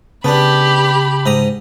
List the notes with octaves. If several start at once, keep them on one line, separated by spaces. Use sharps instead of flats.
C#3 B3 D4 G4 A5 B5
G#2 A#5 D#6